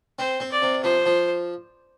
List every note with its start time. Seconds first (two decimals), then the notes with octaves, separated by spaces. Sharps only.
0.19 C4 C5
0.40 C4
0.52 D5
0.62 C3
0.84 F3 C5
1.06 F3